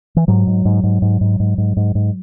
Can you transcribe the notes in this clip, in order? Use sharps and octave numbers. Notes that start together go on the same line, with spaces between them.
E3
G#2 F#3
G#2
G#2
G#2
G#2
G#2
G#2
G#2
G#2
G#2